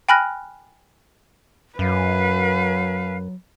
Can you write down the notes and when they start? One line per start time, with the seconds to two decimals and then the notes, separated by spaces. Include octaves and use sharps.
0.09 G5 G#5 B5 F6 F#6 A#6
1.79 F#2 F#3 B4 F5 G#5